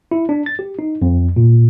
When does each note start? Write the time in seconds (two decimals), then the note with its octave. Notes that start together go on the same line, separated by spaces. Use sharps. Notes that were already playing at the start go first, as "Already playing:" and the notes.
0.11 E4
0.29 D4
0.46 A6
0.59 G4
0.79 D#4
1.02 F2
1.36 A#2